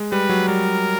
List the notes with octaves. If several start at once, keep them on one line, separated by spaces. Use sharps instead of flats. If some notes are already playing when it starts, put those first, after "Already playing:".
Already playing: G#3
G3 B4
F#3
G3 A#4